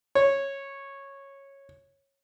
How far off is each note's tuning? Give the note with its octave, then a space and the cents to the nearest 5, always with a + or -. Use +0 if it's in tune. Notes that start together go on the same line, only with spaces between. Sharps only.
C#5 -10